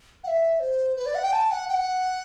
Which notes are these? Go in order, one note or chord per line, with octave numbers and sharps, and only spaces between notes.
F#5
E5
C5
B4
D5
F#5
G5
A5
F#5
G5
F#5